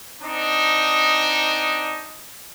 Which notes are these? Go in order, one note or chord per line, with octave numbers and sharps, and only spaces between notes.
C4 D4 D#4